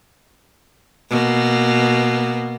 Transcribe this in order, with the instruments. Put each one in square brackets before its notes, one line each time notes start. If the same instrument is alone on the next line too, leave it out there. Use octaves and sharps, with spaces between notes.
[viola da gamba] B2 A#3